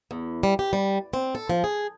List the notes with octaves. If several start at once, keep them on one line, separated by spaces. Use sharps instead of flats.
E2
G3
G4
G3
C4
A4
F3
G#4